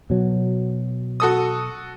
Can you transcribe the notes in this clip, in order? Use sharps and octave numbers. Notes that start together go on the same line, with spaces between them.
B2 F#3
F#4 A4 D#6